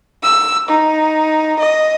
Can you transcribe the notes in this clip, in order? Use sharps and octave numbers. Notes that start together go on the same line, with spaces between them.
E6
D#4
D#5